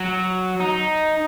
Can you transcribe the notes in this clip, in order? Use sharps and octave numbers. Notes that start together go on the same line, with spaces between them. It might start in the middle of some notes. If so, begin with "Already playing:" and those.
Already playing: F#3
D#4